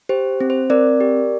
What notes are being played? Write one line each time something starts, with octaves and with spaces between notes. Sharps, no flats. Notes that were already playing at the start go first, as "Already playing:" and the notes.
G4 C5
C4
C5
C4 A#4 D5
G4